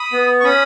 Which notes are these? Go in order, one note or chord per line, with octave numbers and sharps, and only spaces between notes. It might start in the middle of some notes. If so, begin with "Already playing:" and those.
Already playing: B5 D#6
B3
C#6
C#4 B5 D#6